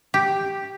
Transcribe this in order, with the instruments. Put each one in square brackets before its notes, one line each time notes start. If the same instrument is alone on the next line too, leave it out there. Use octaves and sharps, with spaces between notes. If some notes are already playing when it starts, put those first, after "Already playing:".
[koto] G4